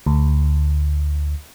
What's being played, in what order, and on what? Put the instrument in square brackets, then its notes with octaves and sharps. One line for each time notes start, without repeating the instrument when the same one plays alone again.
[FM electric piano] D2